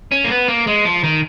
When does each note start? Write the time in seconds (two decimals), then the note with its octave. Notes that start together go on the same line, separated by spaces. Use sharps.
0.12 C#4
0.24 A#3
0.30 B3
0.48 A#3
0.67 G#3
0.85 F3
1.04 D#3